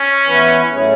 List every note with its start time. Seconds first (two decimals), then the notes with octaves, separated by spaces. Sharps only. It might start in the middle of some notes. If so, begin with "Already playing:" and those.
Already playing: C#4
0.26 E3 B3 E4 B4
0.71 A2 F#3 C#4 E4 G#4